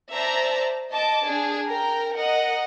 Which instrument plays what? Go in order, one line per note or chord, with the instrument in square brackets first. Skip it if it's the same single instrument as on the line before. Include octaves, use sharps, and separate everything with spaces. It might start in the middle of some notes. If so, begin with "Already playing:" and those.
[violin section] C5 D5 E5 A5 A#5
D#5 A5 D6
D4 G#4
A#4 G5 A#5
A#4 D#5 F#5